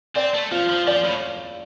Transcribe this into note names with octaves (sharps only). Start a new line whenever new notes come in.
C4 D5
A3
F3 F4
F3
F3 D5
A2